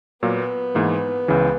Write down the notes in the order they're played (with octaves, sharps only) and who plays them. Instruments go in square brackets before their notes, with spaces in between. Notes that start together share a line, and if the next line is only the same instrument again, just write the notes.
[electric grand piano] A#2 F#3 A#3 [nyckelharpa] B3
[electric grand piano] G#2 E3 A#3
C#2 C#3 E3